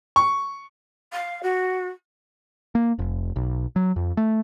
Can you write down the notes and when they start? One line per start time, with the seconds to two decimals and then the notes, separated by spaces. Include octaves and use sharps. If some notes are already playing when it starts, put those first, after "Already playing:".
0.16 C#6
1.12 F5
1.43 F#4
2.75 A#3
2.99 F1
3.36 B1
3.76 F#3
3.96 F2
4.17 A3